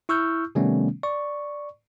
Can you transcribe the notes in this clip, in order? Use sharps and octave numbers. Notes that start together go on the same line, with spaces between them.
E4 C#6 E6 F6 G6
C3 D#3 G3 A3 B3 C#4
D5 C#6